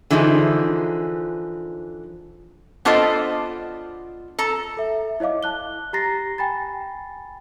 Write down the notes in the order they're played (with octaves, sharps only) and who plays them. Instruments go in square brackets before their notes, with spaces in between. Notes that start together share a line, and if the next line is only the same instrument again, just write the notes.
[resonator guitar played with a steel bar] D3 E3 F3 D#4 G#4
B3 D4 F4 A4 C5 D#5
A4 A#5
[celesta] A4 E5
E4 C#5 D#5 F5 D6
A5 F#6 G7
G4 A#5 A6 A#6 C7
G5 G#5 B5 A6